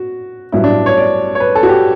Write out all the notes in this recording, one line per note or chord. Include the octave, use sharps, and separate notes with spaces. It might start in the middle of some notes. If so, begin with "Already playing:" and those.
Already playing: F#4
A1 G2 F#3 E4
D4
C#5
D5
C#5
B4
A4
F#4
G4